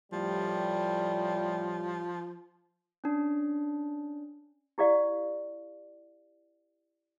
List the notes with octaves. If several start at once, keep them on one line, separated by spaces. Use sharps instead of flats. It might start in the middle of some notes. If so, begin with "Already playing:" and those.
A2 F3 G3
C#4 D4
E4 G4 D5 F5